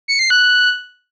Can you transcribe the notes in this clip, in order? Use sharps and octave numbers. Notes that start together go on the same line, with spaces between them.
C#7
C7
F#6